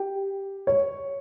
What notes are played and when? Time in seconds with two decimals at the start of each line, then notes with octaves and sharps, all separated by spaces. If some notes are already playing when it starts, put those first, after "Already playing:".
Already playing: G4
0.67 C#5